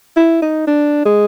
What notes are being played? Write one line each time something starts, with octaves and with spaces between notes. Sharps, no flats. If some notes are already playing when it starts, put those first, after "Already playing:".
E4
D#4
D4
G#3